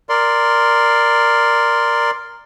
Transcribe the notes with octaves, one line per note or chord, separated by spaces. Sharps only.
A#4 D5 C6